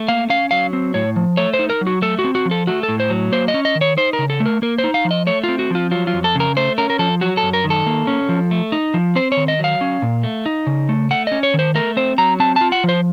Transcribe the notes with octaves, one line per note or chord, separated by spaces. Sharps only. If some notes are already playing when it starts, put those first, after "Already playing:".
Already playing: A3
A#3 F5
C#4 F5
F#3 F5
C4
A2 C#5
F3
A3 C#5
C5
D#4
A#4
F#3
F#4
A3 A4
F#4
C4
F#4
F3
A4
A3 F#4
A4
A2
C5
F#3
A#3 C5
D#5
C#4
D#5
D#3
C#5
D#4 C5
A#4
C#3
A4
A3
A#4
A#3 A#4
C5
D#4
F5
F3
D#5
A3 C#5
F4
C4
F#4
F3 F4
F#3 F4
F4
F2
A4
C#3 A#4
A3 C5
C#4 A#4
A#4
F3 A4
F#3 F#4
A4
F#2
A#4
D#3
A4
A#3
C#4
F3
A3
D#4
F3
C4 C5
C#5
D#3
D#5
F#3 F5
C#4
A#2
A3
D#4
C#3
A3
A3 F#5
C#4 D#5
C#5
D#3 C5
A3 A#4
C4 C5
F#3 A#5
C4 A5
F4 A5
F#5
F3 C5